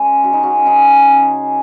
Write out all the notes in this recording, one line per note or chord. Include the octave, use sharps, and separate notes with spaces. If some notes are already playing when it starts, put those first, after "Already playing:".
Already playing: G#3 C#4
C#3 F#4
D#4
C#4 F#4
C#3 D#4 G#4
C#3